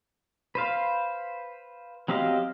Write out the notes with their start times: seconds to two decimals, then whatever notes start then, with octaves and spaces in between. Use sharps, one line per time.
0.55 B4 C5 F5
2.08 F#3 C4 G4 D#5 F5